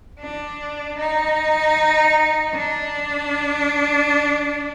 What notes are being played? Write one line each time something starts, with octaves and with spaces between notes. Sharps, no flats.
D4
D#4
D4